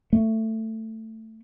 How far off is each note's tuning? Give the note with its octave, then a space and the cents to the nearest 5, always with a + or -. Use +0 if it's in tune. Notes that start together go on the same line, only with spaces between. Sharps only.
A3 +15